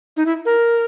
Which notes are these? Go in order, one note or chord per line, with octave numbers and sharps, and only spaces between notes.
D#4
E4
A#4